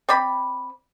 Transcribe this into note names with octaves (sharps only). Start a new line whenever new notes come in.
C4 D5 B5